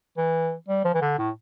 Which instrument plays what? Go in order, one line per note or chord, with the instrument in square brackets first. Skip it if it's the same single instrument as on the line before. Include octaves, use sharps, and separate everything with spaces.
[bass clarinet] E3
G3
F3
E3
D3
A2